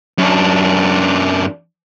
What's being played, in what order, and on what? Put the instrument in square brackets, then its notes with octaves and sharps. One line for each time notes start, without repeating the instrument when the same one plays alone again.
[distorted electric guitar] F#2 D4